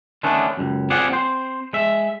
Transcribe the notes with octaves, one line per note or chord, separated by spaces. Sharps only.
D3 D#3 A3 B3 C#4 D4
C#2 F#2
C4 F4 G4 G#4 D5 F#5
C4 C5
G#3 E5